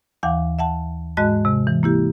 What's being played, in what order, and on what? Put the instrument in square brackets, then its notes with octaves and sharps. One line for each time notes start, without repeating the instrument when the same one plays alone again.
[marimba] D#2 E3 F5 F#5 G#5 D6
E5 F#5 A5
G#2 G#3 F#4 D#5 A5 F#6
C3 G#3
E3
A#3 E4 G4